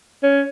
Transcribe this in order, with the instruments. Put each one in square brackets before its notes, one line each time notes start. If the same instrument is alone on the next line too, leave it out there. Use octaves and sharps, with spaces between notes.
[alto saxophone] C#4